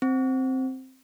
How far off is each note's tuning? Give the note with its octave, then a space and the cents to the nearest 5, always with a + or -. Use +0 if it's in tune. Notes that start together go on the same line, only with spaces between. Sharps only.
C4 +0